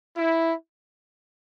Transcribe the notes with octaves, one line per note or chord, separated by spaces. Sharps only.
E4